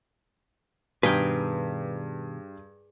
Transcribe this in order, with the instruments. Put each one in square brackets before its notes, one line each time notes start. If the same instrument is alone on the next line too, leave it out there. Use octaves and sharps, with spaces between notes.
[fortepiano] G2 [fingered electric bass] B2 D#3 [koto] G#4 A#4 G5 [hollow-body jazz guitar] B4